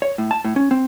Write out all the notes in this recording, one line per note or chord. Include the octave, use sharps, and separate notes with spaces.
C#5
A2
A5
A2
C#4
C4